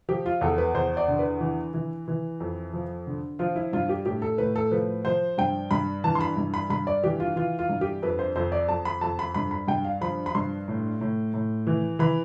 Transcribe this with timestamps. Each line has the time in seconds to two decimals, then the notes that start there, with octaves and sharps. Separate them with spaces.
0.09 F3 G4
0.26 F4
0.41 E2 A4
0.58 B4
0.74 E2 C5
0.97 D5
1.08 D3
1.19 B4
1.40 E3
1.74 E3
2.08 E3
2.40 F2
2.73 F3
3.07 D3
3.39 F3 F4
3.56 E4
3.73 G2 F4
3.89 G4
4.06 A2 G4
4.22 A4
4.38 A2 B4
4.56 A4
4.71 F3 B4
5.05 F3 C5
5.38 G2 G5
5.71 G2 B5
6.04 E3 A5
6.15 C6
6.21 B5
6.37 G2
6.54 B5
6.70 G2 B5
6.87 D5
7.04 E3 G4
7.20 F4
7.36 E3 F4
7.59 F4
7.69 G2
7.81 G4
8.02 F2 B4
8.19 C5
8.36 F2 C5
8.52 D5
8.68 F2 A5
8.85 B5
9.01 F2 A5
9.19 B5
9.34 G2 B5
9.51 B5
9.68 G2 G5
9.84 F5
10.01 F3 B5
10.26 B5
10.35 G2 C6
10.68 A2
11.01 A2
11.34 A2
11.67 E3
11.99 E3 B5